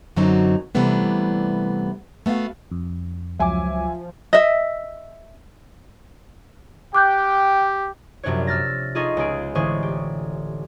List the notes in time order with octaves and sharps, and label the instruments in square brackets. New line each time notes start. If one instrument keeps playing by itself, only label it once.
[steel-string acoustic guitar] F#2 D3 F#3 C4 D#4 F#4
C3 E3 G3 A3 B3 D4
A3 B3 F#4 F5
[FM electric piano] F2
[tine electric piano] C#2 F#3 D6 [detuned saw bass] F3 [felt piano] E5 G#5
[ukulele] D#5 E5
[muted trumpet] G4 [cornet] G5 [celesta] D6 F#6 G6
[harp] A#1 F#2 C3 D4 C5 C#5
E6 F6 A6 A#6
D#4 F4 G#4 A4 D#5 C#6
C#2 C#4 G#4 D7
A1 D3 G#3 G#4 C5 C#6
G4